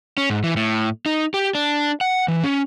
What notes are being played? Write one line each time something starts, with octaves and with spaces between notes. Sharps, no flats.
C#4
G#2
E3
A2
D#4
G4
D4
F#5
E3
C#4